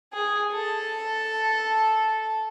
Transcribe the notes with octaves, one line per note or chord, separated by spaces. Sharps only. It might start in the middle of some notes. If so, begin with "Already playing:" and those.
G#4
A4